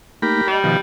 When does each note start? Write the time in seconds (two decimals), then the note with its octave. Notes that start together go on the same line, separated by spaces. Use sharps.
0.22 A3 A#3 D#4 G4 A#4 B5
0.47 G3 D#5 A5
0.64 B2 D#3 F3